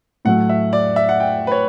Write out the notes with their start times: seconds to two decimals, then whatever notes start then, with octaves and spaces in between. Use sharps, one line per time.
0.25 A2 F#3 A3 F#5
0.49 E5
0.73 D5
0.96 E5
1.09 F#5
1.20 G5
1.47 B4
1.52 C#5